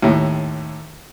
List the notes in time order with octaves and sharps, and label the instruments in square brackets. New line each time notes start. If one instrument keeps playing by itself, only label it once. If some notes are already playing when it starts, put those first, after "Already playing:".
[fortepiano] D#2 A2